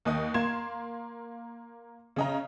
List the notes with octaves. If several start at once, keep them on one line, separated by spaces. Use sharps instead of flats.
D#2 D#5 D#6
A#3 C6 G#6 E7
C#3 D#5 A#5